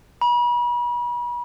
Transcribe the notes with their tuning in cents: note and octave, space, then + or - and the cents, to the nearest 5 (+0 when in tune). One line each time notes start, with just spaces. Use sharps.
B5 -40